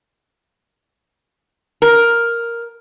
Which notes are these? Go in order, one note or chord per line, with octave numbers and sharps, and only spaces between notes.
A#4